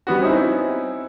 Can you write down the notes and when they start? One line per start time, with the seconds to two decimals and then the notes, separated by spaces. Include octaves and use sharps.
0.07 G3 B3 F#4
0.20 C4 C#4 D#4 E4